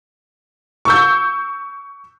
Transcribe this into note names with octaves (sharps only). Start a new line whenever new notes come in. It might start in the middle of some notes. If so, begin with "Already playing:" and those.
C#6 E6 G6